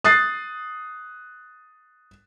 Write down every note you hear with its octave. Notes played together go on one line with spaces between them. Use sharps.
D#6 F#6 A6 C7